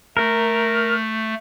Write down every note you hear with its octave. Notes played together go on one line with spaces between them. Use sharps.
A3 A#4